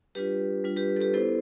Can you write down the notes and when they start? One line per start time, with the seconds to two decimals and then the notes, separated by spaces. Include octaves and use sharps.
0.15 G3 D4 F4 G4 B4
0.64 G3 D4 F4
0.76 G4 B4
0.96 A4
1.01 G4 B4
1.13 B3 E4 A4 C5